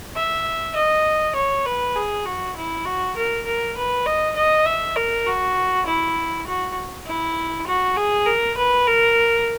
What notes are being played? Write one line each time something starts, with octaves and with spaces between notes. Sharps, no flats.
E5
D#5
C#5
B4
G#4
F#4
E4
F#4
A#4
A#4
B4
D#5
D#5
E5
A#4
F#4
E4
F#4
E4
F#4
G#4
A#4
B4
A#4